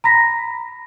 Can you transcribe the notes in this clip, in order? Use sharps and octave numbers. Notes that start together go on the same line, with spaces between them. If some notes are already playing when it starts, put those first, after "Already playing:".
A#5 B5 A#6 B6